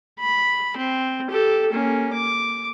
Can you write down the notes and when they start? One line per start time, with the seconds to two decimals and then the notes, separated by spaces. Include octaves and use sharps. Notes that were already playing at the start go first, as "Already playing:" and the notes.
0.20 B5
0.77 C4
1.31 G4 A4
1.71 A#3 C#4
2.13 D6